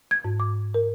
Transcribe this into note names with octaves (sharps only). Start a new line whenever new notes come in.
G#6
G#2
D6
A#4